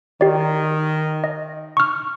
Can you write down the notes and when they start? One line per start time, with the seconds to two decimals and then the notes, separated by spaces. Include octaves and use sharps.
0.21 D#3 G4 D5
1.24 D#5
1.77 C#6 F6